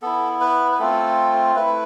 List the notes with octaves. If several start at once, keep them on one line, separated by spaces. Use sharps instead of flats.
B3 E4 A4
B4
B4
A3 C4 F4 A4
A3 E4 B4